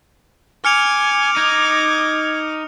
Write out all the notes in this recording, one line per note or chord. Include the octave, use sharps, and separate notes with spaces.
G#5 D6 F6 C#7 F7
D#4 G#6